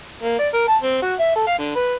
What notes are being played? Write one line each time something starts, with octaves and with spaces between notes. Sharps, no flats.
A#3
D5
A#4
A5
C4
F#4
E5
A4
F5
D3
B4